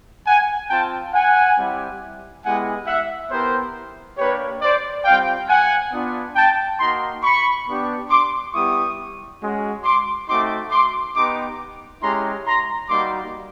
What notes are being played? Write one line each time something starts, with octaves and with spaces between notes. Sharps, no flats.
F#5 G#5
C4 F4 G5 A5
F#5 G#5
G3 C4 E4 G4
G#3 B3 E4 G4 F#5 G#5
E5 F#5
B3 E4 G4 A#4 C5
A#3 D4 G4 B4 C#5
C5 D5
G3 C4 F4 F5 G5
F#5 G#5
B3 D4 F4
G5 A5
A#3 D#4 F#4 A#5 C6
B5 C#6
B3 D4 G4
C6 D6
G3 B3 E4 G4 C#6 D#6
G#3 C#4 F#4
C6 D6
A3 C4 D#4 F#4 C6 D6
C6 D6
B3 D#4 G4 C6 D6
G#3 C#4 E4 G4 A#5 C6
A#5 C6
G3 A#3 D#4 F#4 C6 D6